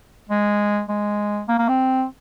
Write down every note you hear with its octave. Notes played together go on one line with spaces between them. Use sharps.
G#3
G#3
A#3
A#3
C4